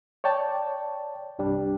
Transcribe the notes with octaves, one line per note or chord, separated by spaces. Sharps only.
C#5 D5 G5 A5
C2 G2 G3 D4